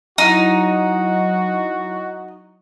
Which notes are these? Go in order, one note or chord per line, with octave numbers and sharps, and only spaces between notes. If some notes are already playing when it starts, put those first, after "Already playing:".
F#3 D#4 E4 F#4